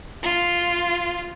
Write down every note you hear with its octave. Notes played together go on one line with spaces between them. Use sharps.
F4